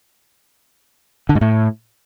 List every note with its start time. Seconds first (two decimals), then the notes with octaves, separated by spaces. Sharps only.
1.29 D3
1.35 G#2
1.41 A2